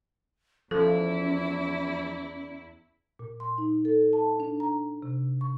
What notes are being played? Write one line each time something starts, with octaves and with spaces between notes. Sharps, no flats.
E2 F3 C#4 E4 A4
A#2
C6
D#4
A4
A5
D4
A#5
C3
C#6